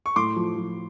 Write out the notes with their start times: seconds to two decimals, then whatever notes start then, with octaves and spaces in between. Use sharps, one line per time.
0.06 C#6
0.16 A2 C6 D6
0.36 F3
0.56 F3